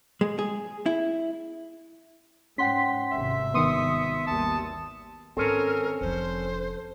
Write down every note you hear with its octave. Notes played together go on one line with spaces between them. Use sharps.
G#3
G#4
E4
G#2 C#4 F#5 G5 C6 B6
G#1 G2 C3 E5
D#3 B3 C6 D#6 C#7
G#1 D#2 G3 A5
G#2 D#3 C4 C#4 A4 A#4
F1 F3 C5